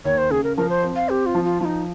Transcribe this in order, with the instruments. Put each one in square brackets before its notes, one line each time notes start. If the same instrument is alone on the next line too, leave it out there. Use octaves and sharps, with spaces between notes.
[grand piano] D#2 [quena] C#5
[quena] C5
[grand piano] C#3 [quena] G#4
[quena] A#4
[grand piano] F3 [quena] A#4
[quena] C5
[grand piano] C4
[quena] F5
[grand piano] C4 [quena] G4
[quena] F4
[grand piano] F3
[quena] F4
[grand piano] F3 [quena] F4
[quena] D#4